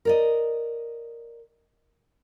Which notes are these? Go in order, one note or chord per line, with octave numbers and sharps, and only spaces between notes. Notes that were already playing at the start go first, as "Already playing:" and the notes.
A#4 D5 D#5